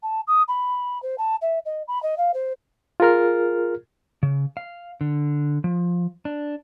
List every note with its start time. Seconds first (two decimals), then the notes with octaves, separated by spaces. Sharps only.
0.03 A5
0.27 D#6
0.48 B5
1.02 C5
1.18 A5
1.41 E5
1.65 D#5
1.88 B5
2.03 D#5
2.18 F5
2.34 C5
3.00 F4 G#4 A#4 F6
4.23 C#3
4.57 F5
5.01 D3
5.64 F3
6.25 D4